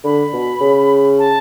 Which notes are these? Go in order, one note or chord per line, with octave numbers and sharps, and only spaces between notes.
D3 B5
B2
C#3
A5